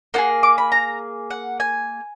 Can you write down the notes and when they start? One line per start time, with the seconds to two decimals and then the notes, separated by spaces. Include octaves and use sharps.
0.14 A#3 F4 G#4 F#5
0.43 D6
0.58 B5
0.72 A#5
1.31 F#5
1.60 G#5